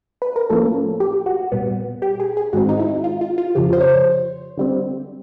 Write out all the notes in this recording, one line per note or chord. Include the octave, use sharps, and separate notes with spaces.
B4
A#4
A2 F3 A#3 C#4 A4
G4
F#4
A#2 G3 B3
G4
G#4
G#4
G#2 D#3 G#3 C4 F#4
D#4
E4
F4
F4
F4
F2 C#3 F3 G4
C5
C#5
C5
D3 G3 C4